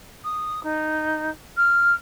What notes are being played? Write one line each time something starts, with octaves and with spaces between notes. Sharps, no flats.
D#6
D#4
F6